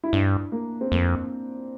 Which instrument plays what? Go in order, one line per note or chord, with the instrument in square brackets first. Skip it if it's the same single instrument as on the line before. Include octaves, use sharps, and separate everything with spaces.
[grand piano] E4
[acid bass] G2 [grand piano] D4
[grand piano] A#3
C4
[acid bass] F2 [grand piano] A#3